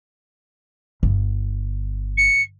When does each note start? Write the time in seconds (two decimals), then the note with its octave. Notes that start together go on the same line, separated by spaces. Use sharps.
1.03 G1
2.17 C#7